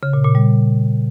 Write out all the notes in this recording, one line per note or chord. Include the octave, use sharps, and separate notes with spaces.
C#3
A#2
A#2
G3